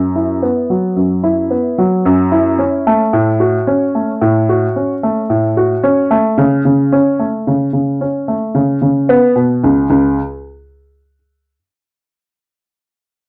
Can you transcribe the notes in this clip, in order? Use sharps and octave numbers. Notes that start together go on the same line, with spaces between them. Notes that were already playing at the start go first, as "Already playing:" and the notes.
Already playing: F#2
E4
B3
F#3
F#2
E4
B3
F#3
F#2
E4
C#4
A3
A2
F#4
C#4
A3
A2
F#4
C#4
A3
A2
F#4
C#4
A3
C#3
C#3
C#4
A3
C#3
C#3
C#4
A3
C#3
C#3
B3
B2
C#2
C#2